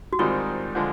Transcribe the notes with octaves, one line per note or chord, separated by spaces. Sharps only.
F#4
G#2 D#3 G3 C4 F4
D3 F3 G#3